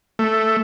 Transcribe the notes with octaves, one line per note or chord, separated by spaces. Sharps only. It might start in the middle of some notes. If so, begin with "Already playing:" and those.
A3